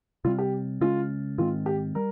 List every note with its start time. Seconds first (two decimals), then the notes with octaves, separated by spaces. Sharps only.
0.24 C3 G3 C4 F4
0.38 G4
0.81 C#3 G#3 C#4 F4
1.38 G#2 D#3 G#3 C4 F4
1.66 G4
1.95 G3 A#4